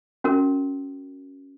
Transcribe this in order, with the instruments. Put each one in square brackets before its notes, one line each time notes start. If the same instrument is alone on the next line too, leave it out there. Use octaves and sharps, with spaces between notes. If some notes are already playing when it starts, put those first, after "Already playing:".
[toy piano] C#4 F#4 A#4